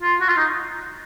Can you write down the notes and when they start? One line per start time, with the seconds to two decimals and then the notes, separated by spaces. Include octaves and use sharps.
0.02 F4
0.20 F#4
0.29 F4
0.37 D#4